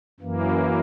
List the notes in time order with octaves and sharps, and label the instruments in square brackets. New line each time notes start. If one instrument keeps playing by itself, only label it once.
[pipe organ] F#2 E3 A#3